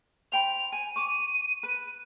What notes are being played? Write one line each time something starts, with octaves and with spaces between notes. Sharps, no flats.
C5 G5 B5 F7
G#5 D#7
C#6 D6
B4